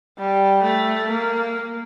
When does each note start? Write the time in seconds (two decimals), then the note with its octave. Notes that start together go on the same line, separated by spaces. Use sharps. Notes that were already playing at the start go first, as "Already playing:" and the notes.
0.18 G3
0.63 A3
1.10 A#3